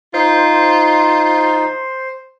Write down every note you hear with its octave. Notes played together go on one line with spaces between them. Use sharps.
D#4 F4 C5